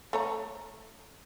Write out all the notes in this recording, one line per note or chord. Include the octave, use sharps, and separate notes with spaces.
A3 C#5 A#5